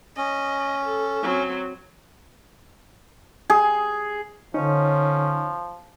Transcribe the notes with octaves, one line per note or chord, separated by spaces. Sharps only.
C#4 D#5
A4
F#3 C4
G#4
D3 F3 C#4 D#4 C#5